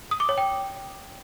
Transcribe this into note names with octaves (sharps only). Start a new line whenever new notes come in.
D#6
D6
C#5
G5